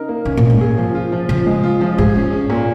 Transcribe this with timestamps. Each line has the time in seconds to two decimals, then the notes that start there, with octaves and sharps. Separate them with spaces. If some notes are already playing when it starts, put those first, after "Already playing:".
Already playing: C#3 D#4 A#4
0.09 A#3
0.25 C#3 C#4
0.37 A#2
0.43 C#3
0.50 G#2
0.61 G#4
0.78 F3
0.95 F4
1.12 F3
1.29 C#3 F3
1.46 G#3
1.63 F4
1.81 F3
1.98 G#2 G#4
2.15 C#4
2.33 C#4
2.50 A#2